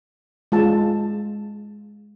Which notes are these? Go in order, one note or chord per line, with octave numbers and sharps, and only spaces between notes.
G#3 F4 A5